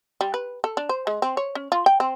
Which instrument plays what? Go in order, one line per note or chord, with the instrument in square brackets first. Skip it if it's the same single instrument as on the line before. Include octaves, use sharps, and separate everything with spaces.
[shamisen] G3
B4
A4
D4
C5
G#3
C4
C#5
C#4
F4
G5
C4